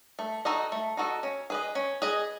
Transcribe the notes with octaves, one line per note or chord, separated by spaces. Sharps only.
A3
D#4 F#4 A4 D#5
A3
D#4 F#4 A4 D#5
C#4
G#4 B4 D#5
C#4
G#4 B4 D#5